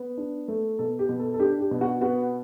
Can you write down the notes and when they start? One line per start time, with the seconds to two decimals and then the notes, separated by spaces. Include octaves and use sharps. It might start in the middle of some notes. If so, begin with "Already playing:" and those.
Already playing: B3
0.17 D4
0.48 A3
0.79 B2 A4
0.99 G4
1.09 B2
1.20 A4
1.34 A4
1.39 D4 G4
1.60 G4
1.71 B2
1.81 F#4
2.01 B3 F#4